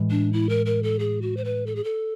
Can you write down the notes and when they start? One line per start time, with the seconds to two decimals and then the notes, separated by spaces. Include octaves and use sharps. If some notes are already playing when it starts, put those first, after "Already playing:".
Already playing: A2 E3 G#3
0.11 D4
0.33 E4
0.49 A#4
0.66 A#4
0.83 A4
0.99 G#4
1.22 F#4
1.37 C5
1.45 B4
1.66 A4
1.76 G#4
1.84 A4